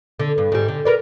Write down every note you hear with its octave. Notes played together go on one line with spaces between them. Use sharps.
D3
G2
G#2 G3
D3
A#4 B4 D5